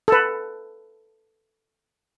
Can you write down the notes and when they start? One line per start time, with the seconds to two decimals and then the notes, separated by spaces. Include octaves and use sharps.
0.08 A4 B4